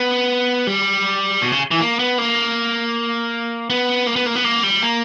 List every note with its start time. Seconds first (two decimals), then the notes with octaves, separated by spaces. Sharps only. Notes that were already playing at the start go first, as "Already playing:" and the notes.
Already playing: B3
0.67 G3
1.42 B2
1.52 C#3
1.71 E3
1.80 A#3
1.99 B3
2.18 A#3
3.70 B3
4.07 A#3
4.16 B3
4.26 A#3
4.35 B3
4.44 A#3
4.63 G3
4.83 A#3